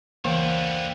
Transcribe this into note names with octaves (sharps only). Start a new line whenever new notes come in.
C#2 D3 E3 A#3 B3 C5 F5 G5